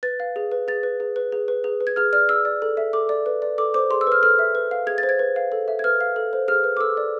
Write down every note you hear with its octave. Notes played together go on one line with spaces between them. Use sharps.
B4 A6
F5
G#4
B4
G#4 A6
B4
G#4
B4
G#4
B4
G#4
B4
G#6
G#4 F6
D5 F6
G#4 E6
D5
A4
E5
A4 D6
D5
B4
D5
A4 D6
C5 D6
G#4 C6
E6
B4 F6
A4 F6
E5
B4
F5
G#4 G#6
A6
C5
G#6
B4
F5
A4
E5
G#6
B4 F6
F5
A4
C5
G#4 F6
B4
D6
A4 E6
D5